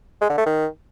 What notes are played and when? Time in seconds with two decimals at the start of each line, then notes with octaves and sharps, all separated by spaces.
0.21 G#3
0.29 D3
0.38 A3
0.46 D#3